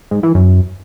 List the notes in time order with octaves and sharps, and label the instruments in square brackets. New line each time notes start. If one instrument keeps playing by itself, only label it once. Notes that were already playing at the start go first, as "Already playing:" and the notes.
[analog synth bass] G#2
E3
F#2